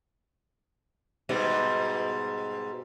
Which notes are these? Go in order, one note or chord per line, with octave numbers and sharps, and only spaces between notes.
G#2 B2 G3